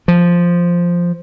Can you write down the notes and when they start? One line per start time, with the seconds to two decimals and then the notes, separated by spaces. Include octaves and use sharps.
0.08 F3